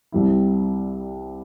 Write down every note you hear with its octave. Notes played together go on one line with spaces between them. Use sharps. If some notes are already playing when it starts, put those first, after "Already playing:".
C2 C3 G3 C4 E4